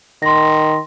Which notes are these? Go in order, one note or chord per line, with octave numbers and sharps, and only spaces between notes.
D#3 C6 A#6